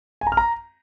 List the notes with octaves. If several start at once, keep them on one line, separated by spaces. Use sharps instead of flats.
G#5
A#5
F6
A#5